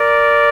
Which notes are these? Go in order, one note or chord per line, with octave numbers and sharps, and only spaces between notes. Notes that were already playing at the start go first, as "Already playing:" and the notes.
Already playing: A#4 D5